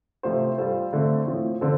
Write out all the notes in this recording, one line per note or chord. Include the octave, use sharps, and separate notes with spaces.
C3 F3 A3 F4 C5
G3 F4 A4 C5
D3 A3 C4
A2 F3 C4
D3 F3 C4 A4